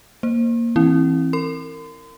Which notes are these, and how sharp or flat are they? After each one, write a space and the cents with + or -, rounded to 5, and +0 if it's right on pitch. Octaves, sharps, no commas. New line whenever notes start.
A#3 +0 C5 +0
E3 -15 C4 +30 E4 +0
A#4 -35 C6 -40